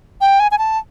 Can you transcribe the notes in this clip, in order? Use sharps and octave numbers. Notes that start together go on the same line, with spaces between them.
G5
G#5
G#5
A5